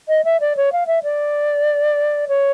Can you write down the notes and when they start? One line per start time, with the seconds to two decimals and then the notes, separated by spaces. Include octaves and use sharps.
0.09 D#5
0.24 E5
0.40 D5
0.57 C#5
0.72 F5
0.87 E5
1.03 D5
2.28 C#5